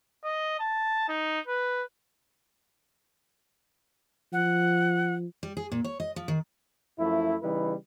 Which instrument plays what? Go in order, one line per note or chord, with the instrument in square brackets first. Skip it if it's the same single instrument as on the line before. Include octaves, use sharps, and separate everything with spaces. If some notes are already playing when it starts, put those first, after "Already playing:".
[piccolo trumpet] D#5
A5
D#4
B4
[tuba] F3 [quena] F#5
[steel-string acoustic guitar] G3
G#4
A#2
C#5
D#5
F3
D#3
[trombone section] F#2 F3 A3 E4
C#3 E3 G3 D#4 E4 B4